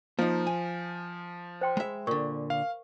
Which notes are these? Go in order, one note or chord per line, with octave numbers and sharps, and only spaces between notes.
F3 A#3 D#4
G#5
C5 G5 C6
G#3 E5 B5
A#2 D3 A#4 C#6
F5